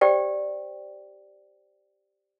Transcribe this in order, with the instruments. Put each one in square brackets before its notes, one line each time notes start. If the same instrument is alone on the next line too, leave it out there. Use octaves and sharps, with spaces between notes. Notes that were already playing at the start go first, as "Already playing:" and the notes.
[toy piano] G4 C5 D5 G5